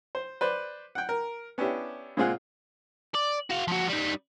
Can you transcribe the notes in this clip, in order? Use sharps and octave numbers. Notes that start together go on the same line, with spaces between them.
C5
B4 C5 D5
F#5 G5
A#4
B3 C#4 D4 E4 G4
A#2 G#3 C4 F4 G#4 F#5
D5
F#4 F5
F3 F#4
G3 D#4